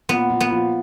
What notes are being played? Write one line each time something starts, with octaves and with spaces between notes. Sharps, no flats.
A#2 B3
A#2
B3
F3